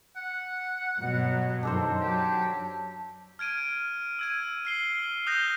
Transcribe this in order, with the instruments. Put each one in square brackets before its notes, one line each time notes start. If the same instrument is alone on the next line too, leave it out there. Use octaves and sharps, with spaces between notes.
[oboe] F#5
[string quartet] G2 B2 F#3
[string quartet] F#2 D#3 [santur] D4 A4 C5
[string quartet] F#3 [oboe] G4
[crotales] F6 G#6 D7 D#7
E6 G#6 D#7
F6 C7 G7
D#6 F#6 G6 A#6 G7